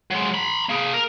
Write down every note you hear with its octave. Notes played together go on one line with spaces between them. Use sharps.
F#3 G#3
A#5 B5
A#3 G#4
A#4